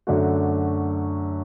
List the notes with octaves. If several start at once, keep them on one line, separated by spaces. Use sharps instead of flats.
F#2 D3 A3 D4 F#4